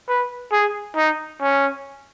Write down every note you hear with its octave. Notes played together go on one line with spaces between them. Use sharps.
B4
G#4
D#4
C#4